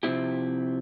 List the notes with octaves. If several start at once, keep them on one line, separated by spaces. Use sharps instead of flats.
C3 F3 F#3 C4 E4 G4